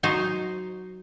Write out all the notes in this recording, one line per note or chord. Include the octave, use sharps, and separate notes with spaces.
F#3 D#4 C5